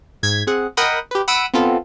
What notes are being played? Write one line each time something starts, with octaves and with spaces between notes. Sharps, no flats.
G#2 G#6 B6
C4 G#4 F#5
A#4 D#5 F#5 G5 B5 D#6
G4 B4
F#5 B5 D#6 E6 D7
B3 C4 F4 A4